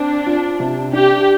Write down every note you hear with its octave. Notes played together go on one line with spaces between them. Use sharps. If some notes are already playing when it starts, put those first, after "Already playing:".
Already playing: C4 D4
F4
C3
D4 G4